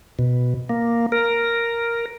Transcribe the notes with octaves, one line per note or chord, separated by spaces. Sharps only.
B2
A#3
A#4